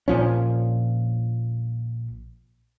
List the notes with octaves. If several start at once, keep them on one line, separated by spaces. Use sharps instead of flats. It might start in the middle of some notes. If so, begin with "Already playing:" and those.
A#1 A#2 F3 C#4